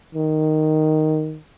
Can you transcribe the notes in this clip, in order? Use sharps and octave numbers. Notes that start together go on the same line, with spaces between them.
D#3